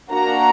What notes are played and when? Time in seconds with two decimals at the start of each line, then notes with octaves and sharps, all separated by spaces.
0.10 A#3 D4 F#4 A#5